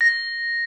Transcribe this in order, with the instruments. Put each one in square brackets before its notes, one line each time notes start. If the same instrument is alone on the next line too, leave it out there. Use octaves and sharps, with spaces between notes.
[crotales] A#6